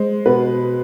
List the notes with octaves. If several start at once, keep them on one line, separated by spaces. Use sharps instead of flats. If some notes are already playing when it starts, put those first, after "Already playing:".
Already playing: G#3 C5
B2 B4